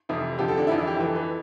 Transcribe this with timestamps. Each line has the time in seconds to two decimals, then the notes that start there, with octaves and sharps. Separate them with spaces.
0.09 F2 C3 E3 E4
0.38 F2 D3 F3 G4
0.48 A4
0.58 D4
0.67 F2 E3 E4
0.78 E4
0.87 G4
0.97 F2 E3
1.07 A4
1.16 B4